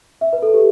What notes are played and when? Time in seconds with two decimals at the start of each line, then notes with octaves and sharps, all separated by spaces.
0.21 E5
0.33 B4
0.42 A4
0.54 G4